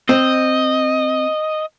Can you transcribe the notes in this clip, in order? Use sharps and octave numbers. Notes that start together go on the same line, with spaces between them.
C4 D#5